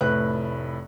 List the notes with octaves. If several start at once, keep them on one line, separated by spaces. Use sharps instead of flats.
F1 A2 A3 B4 F#6